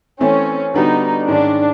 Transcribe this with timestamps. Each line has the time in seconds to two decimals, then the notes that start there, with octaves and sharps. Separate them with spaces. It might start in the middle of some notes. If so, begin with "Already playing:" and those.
0.20 E3 A3 C4 C#4
0.74 D3 G3 B3 D4 D#4 F#4
1.28 G#2 D#3 G#3 C#4 D4